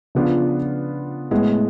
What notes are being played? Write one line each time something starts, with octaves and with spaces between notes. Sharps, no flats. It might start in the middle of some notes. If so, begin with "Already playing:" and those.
C#3 F3 B3 D4 F4
A2 G#3 B3